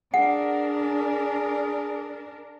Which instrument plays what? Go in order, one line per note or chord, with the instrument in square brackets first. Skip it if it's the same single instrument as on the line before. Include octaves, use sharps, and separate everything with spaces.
[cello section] D4 A#4 [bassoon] G#4 [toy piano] F#5